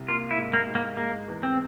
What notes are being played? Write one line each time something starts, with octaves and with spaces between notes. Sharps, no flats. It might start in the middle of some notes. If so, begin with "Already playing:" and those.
Already playing: C2
A#3 F4
E4
G#2
A#3
G#2
A#3
G#3 A#3
E2
C4